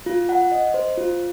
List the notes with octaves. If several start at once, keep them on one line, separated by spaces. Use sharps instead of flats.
F4
F#5
D#5
C5
F4